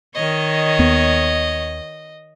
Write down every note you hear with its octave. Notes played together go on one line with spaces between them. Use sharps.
D#3 C#5 D#5
D#2 B3